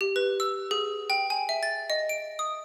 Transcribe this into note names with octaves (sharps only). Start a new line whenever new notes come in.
G4
B4
E6
G#4
G5
G#5
E5
A6
D#5
D7
D#6